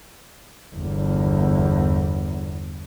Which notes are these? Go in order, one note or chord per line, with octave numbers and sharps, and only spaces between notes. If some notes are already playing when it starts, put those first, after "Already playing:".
G1 E2